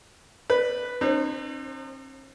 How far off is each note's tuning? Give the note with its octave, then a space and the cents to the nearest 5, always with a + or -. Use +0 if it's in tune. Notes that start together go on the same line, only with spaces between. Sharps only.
B4 +0 D5 +20
C4 +45 D#4 -40 C5 +15